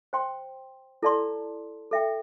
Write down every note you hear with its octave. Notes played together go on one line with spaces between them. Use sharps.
C5 G5 C6
E4 A4 D5 A5 C6
A4 E5 G5